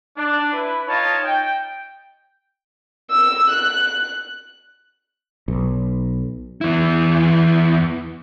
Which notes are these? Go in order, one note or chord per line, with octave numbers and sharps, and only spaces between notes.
D4
E4 B4
D#4 F4 C#5 D#5 A5
G5
E6
F#6
B1
E2 E4